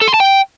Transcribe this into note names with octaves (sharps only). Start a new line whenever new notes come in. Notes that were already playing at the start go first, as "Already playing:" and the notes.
A4
C6
A5
G5